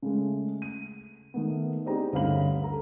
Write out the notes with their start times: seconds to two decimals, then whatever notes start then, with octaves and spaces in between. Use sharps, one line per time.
0.02 C#3 G#3 A3
0.62 D#7
1.34 D#3 A3 B3
1.86 C4 D4 D#4 G4 G#4 A#5
2.13 D2 G2 C#4 F5 B5 F#7
2.64 A4 A#5